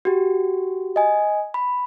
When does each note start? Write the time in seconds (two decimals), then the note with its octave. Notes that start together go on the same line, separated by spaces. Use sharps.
0.05 F#4 G4
0.96 D#5 G#5
1.54 B5